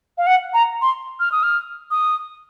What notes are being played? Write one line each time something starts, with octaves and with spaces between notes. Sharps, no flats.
F5
F#5
A#5
C6
F6
D#6
F6
D#6